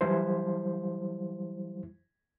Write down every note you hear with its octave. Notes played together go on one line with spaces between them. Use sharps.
E3 F#3 G3 E4 C5